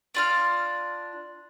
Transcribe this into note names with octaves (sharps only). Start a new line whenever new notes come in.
D4 F4 F6